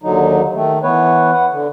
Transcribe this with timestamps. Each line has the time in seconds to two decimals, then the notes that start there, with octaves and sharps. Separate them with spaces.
0.03 D#2 D3 F#3 D#4
0.54 D#3 A3
0.83 E3 B3 B4 C#5
1.32 B4 F#5
1.51 D3